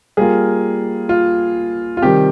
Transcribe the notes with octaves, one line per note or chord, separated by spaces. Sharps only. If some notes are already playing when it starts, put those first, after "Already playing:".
G3 A#3 F4 G#4
F4
F4
C3 D#3 G3 G4